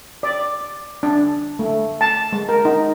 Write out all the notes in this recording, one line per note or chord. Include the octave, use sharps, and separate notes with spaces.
D5
D4
A3
A5
G#3
A#4
D#4